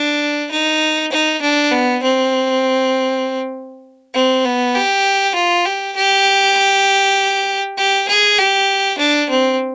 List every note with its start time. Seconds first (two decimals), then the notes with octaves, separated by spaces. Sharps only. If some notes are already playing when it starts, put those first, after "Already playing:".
Already playing: D4
0.51 D#4
1.12 D#4
1.42 D4
1.71 B3
2.03 C4
4.14 C4
4.45 B3
4.75 G4
5.35 F4
5.66 G4
5.96 G4
7.77 G4
8.09 G#4
8.39 G4
8.98 D4
9.30 C4